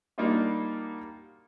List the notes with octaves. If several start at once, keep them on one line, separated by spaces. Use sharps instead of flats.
G3 A#3 D4 D#4 F4 F#4